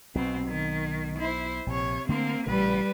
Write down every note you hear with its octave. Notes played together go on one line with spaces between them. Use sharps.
B1 B2 C4
D#3
E4 C5
A#1 C3 C#5
D3 A3 A#3 C4 D4
A1 A#2 C#3 G3 B4